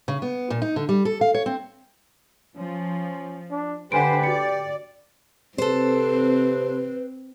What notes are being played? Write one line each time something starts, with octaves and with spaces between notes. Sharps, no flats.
C#3
B3
A#2
D#4
D3
G3
A4
F5
C#5
C4
F3 C#4
D4
D3 G4 B4 C5 F#5 G#5 D7
F#4 D5 C#7
C3 C4 A4 B4 C5